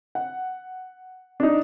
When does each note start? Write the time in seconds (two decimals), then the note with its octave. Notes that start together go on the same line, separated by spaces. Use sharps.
0.15 F#5
1.40 D4 D#4